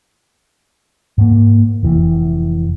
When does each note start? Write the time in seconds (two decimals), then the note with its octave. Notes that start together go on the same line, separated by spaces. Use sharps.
1.18 G#2 A#3
1.83 F1 E3